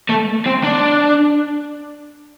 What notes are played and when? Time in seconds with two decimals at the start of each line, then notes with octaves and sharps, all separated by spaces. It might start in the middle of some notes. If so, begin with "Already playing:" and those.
0.09 A3
0.46 C4
0.64 D4